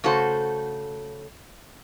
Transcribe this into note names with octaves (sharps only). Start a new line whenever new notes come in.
C#3 A3 F#4 A4 C5